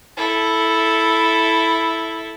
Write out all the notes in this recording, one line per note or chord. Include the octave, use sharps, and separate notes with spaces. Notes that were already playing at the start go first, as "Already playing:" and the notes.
E4 A4